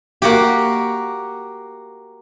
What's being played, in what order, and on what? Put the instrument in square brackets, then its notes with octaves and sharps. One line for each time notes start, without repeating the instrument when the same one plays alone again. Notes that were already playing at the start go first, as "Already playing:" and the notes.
[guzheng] A#3 F#4 G4